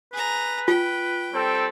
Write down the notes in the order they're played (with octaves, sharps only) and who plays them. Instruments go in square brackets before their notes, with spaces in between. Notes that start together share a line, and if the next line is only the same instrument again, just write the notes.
[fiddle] G#4 A#5 [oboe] B4
[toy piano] F4 [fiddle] G5
[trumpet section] G3 C4 A4